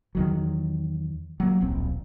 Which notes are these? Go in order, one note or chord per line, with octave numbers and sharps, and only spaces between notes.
E2 D#3 F#3
F#3 A#3
D1 A#1 C4